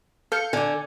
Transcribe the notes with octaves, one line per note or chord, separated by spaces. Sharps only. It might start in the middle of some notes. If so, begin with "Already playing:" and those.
A4 F5 G6 C#7
D3 D5 G#5